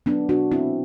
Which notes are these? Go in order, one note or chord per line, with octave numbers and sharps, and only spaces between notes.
F#3 B3 D4
B2 D4 F#4
A3 C4 E4